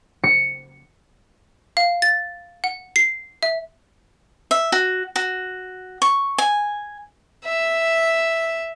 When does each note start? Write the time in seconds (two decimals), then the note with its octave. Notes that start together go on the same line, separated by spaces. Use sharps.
0.24 C#7
1.77 F5
2.02 A6
2.64 F#5
2.96 C7
3.43 E5
4.51 E5
4.72 F#4
5.16 F#4
6.02 C#6
6.38 G#5
7.45 E5